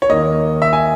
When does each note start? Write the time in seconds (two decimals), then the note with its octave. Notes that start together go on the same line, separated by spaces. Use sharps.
0.02 C#5
0.09 D#2 D#3 A#3 D#5
0.62 E5
0.73 G#5